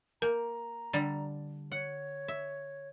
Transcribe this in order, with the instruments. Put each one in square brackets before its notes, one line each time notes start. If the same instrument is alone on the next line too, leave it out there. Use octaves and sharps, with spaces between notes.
[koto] A#3 [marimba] A#4 [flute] A#5
[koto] D3 G3
[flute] C#5 [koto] F#5
[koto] E5